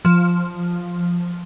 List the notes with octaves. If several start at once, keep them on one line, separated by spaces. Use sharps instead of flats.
F3